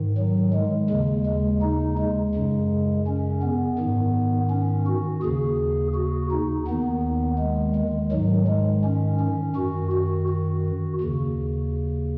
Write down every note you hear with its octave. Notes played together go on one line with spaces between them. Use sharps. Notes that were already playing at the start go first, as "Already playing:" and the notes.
Already playing: G#2 D#3
F#3
G#3
D#2 C#3 G#3
G#3
D#4
G#3
F#2 C#3
C#4
B3
G#2 D#3
C#4
F#4
D#2 C#3 G#4
F#4
D#4
D#2 D#3 B3
G#3
G#3
G#2 D#3 F#3
G#3
C#4
C#4
F#2 D#3 F#4
F#4
F#4
D#2 C#3